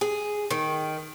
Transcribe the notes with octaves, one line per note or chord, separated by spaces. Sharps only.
G#4
D#3